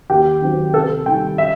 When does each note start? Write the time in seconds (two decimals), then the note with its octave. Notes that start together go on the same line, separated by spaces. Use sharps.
0.10 D#2 G4
0.42 D#3 F#3 C4
0.74 C3 A4
1.06 D#3 G3 G5
1.38 E5